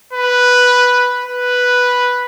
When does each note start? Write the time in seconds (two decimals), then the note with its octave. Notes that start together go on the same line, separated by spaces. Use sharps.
0.13 B4
1.25 B4